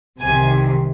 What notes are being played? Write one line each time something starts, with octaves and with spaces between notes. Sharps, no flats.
C2 C3 D#3 G#5